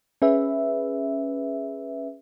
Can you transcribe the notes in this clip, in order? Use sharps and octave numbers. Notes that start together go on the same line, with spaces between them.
C#4 G#4 B4 E5